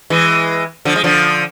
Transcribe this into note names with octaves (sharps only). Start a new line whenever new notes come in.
E3 G#3
D3 F3
G#3
D3 F3